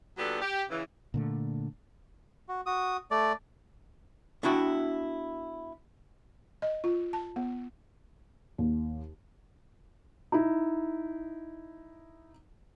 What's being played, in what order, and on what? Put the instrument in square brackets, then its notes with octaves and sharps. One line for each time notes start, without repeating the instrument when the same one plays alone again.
[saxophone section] A#2 F#3 B3 D4 G4 A4
G4
C#3 E3
[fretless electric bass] A#2 D3 A3
[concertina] F#4
F#4 D#6
A3 D5
[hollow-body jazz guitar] B3 D4 E4 F#4 G5
[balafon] D#5
F4
A5
B3
[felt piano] D#2
D#4 E4